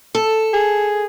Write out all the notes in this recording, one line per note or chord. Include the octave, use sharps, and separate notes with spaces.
A4
G#4